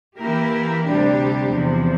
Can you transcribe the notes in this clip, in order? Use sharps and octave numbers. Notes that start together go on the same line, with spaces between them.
E3 A#3 E4 G4 A#4
D2 C3 G3 D4 G4
E2 C3 F3